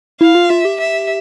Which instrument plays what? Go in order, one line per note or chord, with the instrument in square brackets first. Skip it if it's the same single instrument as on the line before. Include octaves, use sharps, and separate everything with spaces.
[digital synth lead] E4 [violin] F5
[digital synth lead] F4
[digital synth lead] F4 [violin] E5
[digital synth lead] G4
[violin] E5